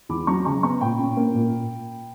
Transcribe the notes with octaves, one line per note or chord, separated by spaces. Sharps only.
E2 B5 D6
F#3 A#5 C#6
C#3 A#5 C#6
B3 A#5 C#6
A#2 G5 B5
C#4
A#3
A#2